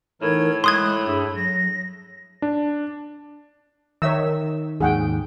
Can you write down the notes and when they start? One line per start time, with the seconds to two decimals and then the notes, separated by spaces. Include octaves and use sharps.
0.22 A2 E3 D#4 A#4 G#6
0.64 G#3 C6 D#6 F#6 G#6
1.05 G2 D4 E4 G#4
1.35 F#3 A#6
2.42 D4
4.02 D#3 C#5 E5 E6
4.81 D#2 G#2 G#4 F#5 G5